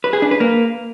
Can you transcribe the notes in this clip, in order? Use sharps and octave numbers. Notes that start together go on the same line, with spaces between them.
B4
G#4
D4
B4
A#3